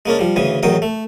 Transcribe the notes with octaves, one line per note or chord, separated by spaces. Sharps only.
G#3 A#3 C#4 D4
F3 G3
D2 C#3 E3 G#5
A1 E2 D#3 F#3 G5 D#6
A3